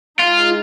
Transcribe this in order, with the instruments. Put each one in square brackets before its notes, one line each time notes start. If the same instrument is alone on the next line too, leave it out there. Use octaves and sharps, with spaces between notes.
[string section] G#3 D#4 G#4 [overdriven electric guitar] F4